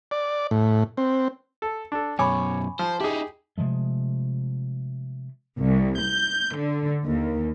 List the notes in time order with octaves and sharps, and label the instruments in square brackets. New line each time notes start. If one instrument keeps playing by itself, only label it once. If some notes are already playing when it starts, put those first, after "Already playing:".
[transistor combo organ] D5
A2
C4
[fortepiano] A4
D4 A4
[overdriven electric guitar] F#2 B2 [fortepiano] C#5 D6 [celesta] G#5 B5 C#6
[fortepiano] F3 [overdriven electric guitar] C5
[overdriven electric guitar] D#4 E4 [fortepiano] G4 G#4
[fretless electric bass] C3 F3 G#3 A3
[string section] C2
G6
D3
D#2